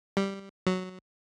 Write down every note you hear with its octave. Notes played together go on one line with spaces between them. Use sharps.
G3
F#3